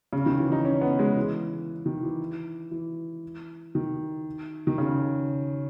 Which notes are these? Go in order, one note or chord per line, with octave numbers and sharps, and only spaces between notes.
C#3
D#3
E3
D#4
C#4
B3
G#3
E3
D#3
E3
E3
D#3
D#3
C#3